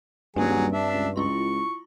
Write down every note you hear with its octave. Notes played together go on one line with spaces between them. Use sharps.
D#1 G2 F#3 G3 C4 G#4
D4 E5
C#2
C#2 E4 F4 C6 C#6